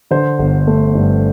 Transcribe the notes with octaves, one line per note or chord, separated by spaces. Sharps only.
D3 C5
G1
A3
G2